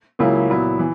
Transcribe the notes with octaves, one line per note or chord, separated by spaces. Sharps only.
C#2 C#3 F#3 A#3 E4
A#2 F#3 B3 E4
E3